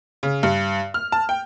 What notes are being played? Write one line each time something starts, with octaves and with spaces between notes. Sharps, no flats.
C#3
G2
F6
A5
G5